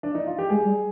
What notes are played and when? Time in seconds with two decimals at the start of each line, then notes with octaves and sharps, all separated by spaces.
0.03 D4
0.15 D#4
0.27 F4
0.38 G4
0.50 G#3 G#4
0.64 G3